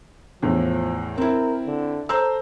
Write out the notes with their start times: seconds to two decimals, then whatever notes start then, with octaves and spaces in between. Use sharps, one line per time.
0.42 E2 A2 F3
1.18 C4 E4 A#4
1.67 D3
2.09 A4 C5 A#5 E6